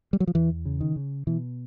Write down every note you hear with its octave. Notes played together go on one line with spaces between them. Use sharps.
G3
F#3
F3
E2 E3
C#3
D#3
C#3
B2 E3